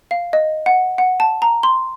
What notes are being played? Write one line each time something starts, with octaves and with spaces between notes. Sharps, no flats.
F5
D#5
F#5
F#5
A5
A#5
C6